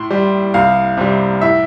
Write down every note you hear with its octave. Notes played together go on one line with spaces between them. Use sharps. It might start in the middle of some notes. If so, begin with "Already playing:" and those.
Already playing: A2 C6
G3
C2 F5
C3 G3
A2 E5